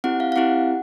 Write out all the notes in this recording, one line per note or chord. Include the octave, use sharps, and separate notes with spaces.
C4 E4 G4 F#5
F5
F5
C4 E4 G4 F#5